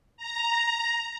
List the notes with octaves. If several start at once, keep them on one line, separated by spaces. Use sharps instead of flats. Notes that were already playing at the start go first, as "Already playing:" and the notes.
A#5